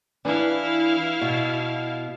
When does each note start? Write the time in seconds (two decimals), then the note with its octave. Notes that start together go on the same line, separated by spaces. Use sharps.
0.25 E3 D4 E4 F5
1.21 B2